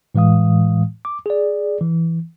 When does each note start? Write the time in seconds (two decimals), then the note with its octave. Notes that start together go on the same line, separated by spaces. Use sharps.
0.15 A2 E3 G#3 F5 D#6
1.05 D6
1.26 G#4 D5
1.81 E3